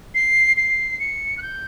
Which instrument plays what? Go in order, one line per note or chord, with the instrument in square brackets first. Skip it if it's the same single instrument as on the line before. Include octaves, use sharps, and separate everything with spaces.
[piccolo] C7
C7
C#7
F#6
G6